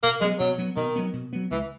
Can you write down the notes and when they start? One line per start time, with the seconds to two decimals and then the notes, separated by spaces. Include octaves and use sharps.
0.03 B2 A#3
0.21 F#3 G#3 B3
0.39 B2 F#3
0.58 F#3 B3
0.76 B2 D#3
0.96 F#3 B3
1.13 B2
1.33 F#3 B3
1.51 C#2 E3